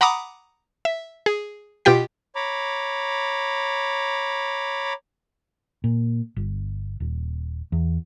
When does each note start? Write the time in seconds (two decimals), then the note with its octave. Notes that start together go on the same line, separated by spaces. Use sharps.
0.01 F#5 A#5 B5 D6 D#6
0.85 E5
1.26 G#4
1.85 B2 F4 G4 G5 B6
2.35 C#5 A#5 B5 D6
5.84 A#2
6.36 G1
7.00 D#1
7.72 E2